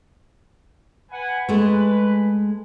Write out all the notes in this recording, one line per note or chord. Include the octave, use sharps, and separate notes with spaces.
B4 F#5 G#5
G#3 A3 B4